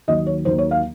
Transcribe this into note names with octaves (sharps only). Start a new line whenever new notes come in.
D#2 D#3 F#3 D#5
C#5
D#2 D#3 F#3 C5
C#5
F5